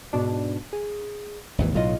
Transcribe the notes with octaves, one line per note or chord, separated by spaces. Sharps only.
G#2 B2 D4
G#4
G#1 D#2 E3
B1 A2 F#3 F4 D#5